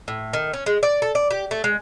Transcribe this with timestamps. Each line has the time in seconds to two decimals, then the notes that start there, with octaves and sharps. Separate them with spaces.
0.08 A2
0.33 D#3
0.53 C#4
0.66 G#3
0.83 D5
1.02 A4
1.15 D5
1.31 G4
1.51 A3
1.64 G#3